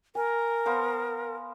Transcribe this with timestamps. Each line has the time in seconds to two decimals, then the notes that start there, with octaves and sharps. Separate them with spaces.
0.15 A#4 G#5
0.66 B3 C5 F5